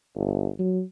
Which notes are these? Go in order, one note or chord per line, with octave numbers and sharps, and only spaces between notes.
G1
F#3